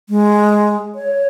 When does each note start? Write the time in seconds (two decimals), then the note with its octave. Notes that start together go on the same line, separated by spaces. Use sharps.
0.09 G#3
0.95 C#5